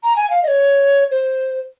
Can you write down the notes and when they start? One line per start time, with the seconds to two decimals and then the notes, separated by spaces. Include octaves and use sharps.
0.04 A#5
0.16 G#5
0.30 F5
0.43 D#5
0.48 C#5
1.11 C5